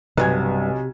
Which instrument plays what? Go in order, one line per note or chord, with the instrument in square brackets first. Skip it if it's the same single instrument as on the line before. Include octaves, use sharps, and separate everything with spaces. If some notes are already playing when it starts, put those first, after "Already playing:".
[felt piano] B1 G#5 G#6 [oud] G2 B3 [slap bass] C3